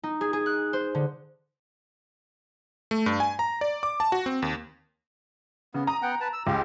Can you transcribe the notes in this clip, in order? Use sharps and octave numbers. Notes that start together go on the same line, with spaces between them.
D#4
G#4
G#4
F#6
C5
D3
A3
G2
G#5
A#5
D5
D6
A5
F#4
C4
D#2
C#3 B3
A#5 D#6
B3 F#5 G5
B4 A5
E6
C#2 F4 G4